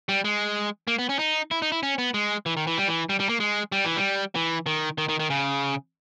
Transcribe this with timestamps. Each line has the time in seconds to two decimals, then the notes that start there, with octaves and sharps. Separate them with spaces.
0.09 G3
0.24 G#3
0.88 A#3
0.99 B3
1.09 C#4
1.19 D#4
1.51 E4
1.62 D#4
1.72 E4
1.83 C#4
1.98 B3
2.14 G#3
2.46 E3
2.57 D#3
2.67 E3
2.77 G3
2.87 E3
3.09 G3
3.20 G3
3.29 A#3
3.40 G#3
3.72 G3
3.85 E3
3.96 G3
4.35 E3
4.66 D#3
4.98 D#3
5.09 D#3
5.20 D#3
5.30 C#3